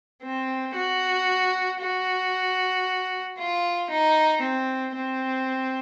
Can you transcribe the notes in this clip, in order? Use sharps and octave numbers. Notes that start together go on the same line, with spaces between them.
C4
F#4
F#4
F4
D#4
C4
C4